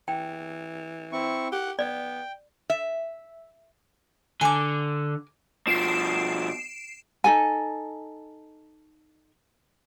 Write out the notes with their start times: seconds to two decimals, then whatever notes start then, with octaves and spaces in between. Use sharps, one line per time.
0.08 E3 G5
1.12 C4 E4 C#6
1.52 G4 F#5
1.79 B3 D5 G5
2.70 E5
4.41 D3 G#5 D6
5.67 B2 F3 C7 D7 E7
7.24 D#4 A4 G#5